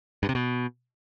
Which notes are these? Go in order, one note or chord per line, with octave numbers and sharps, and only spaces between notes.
G2
C3
B2